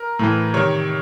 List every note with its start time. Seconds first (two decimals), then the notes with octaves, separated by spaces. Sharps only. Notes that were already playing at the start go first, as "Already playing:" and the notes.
Already playing: A#4
0.19 A2 E3
0.54 C3 D#3 C#5